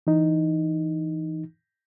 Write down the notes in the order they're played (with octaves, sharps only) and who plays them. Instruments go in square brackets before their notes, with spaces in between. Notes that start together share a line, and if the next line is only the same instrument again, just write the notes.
[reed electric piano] E3 D#4